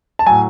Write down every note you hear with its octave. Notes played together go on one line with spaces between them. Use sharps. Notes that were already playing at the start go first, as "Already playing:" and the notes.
A5
A2 F#3 G#5